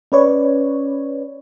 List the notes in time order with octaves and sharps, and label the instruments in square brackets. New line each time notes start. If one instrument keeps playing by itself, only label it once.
[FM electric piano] C#4 B4 C#5 D5